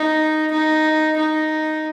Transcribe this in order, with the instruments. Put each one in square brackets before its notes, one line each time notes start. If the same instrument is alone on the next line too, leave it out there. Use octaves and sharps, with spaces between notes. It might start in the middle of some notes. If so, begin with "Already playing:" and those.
Already playing: [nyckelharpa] D#4
D#4
D#4